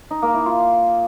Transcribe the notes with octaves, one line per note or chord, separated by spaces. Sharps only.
D#4
A#3
E4
F4